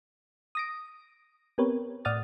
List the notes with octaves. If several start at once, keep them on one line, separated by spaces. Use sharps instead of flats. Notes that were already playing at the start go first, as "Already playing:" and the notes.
D#6 A#6 D7
B3 C4 G4 A#4 B4 C#5
A2 D5 F#5 D#6 F6 A6